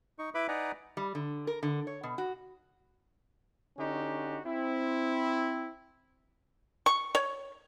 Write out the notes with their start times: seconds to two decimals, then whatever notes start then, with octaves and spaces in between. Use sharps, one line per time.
0.19 D#4 C#6
0.35 E4 B4 E5 B5 D6
0.48 D#4 B4 D5 F#5 G#5 A#5
0.97 G3
1.15 D3
1.47 A#4
1.63 D3
1.87 C#5
2.03 B2
2.18 F#4
3.78 D3 C#4 D#4 F#4 G4
4.45 C4 E4
6.86 C#6
7.15 C#5